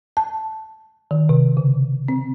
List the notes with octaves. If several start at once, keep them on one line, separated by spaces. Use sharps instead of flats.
A5
D#3
C3
C#3
C4